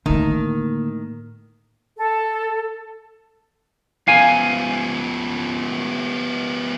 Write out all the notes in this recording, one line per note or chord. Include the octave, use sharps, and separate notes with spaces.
A2 D3 D#3 A#3
A4
F3 B3 F5 G#5